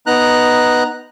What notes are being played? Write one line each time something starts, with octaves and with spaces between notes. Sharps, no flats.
B3 D#4 A#5 F#6